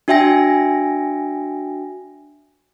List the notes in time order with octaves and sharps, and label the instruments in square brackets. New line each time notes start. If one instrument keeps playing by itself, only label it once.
[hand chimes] D4 F#4 E5 G5 G#5 A#6